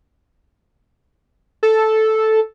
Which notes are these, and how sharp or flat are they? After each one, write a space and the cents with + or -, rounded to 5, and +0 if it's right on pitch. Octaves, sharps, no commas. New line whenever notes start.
A4 -5